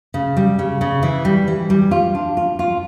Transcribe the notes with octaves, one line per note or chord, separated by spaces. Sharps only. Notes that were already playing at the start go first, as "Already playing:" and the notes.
C#3
G3
C#3
C#3
E3
G3
E3
G3
F4
D4
F4
F4